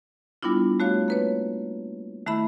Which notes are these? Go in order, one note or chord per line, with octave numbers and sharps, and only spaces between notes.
G3 B3 D4 E4 F4
A3 F#4 C#5 F5
A#3 B4 C#5
D#3 A3 E4 E5 B5